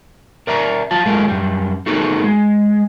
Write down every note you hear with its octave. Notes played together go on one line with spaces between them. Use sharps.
A#4 D5 E5 A#5
F#3 F4 A5
F#3 G#3 A3 F4 A#4
F#2 G3
A3 B3 D#4 F#4 G#4 A#4
G#3